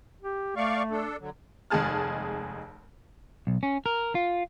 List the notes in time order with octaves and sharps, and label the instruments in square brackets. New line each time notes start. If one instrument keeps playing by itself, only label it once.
[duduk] G4
[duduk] A3 [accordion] D5 F5 C#6
[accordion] D4 A4
D3 F#3
[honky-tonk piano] F1 D#2 G#3 G#4 A5 F6
[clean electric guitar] B1
C#4
A#4
F4